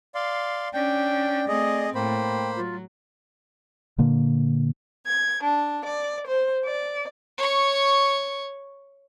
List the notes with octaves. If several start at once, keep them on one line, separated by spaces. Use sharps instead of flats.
D5 F5 C6
C#4 D4 D5 G5
A3 C4 G#4 D#5
A2 A#3 C5 G5 B5
F#3 F4
A#2 D3 A#3
G#6
D4
D5
C5
D5
C#5 C#6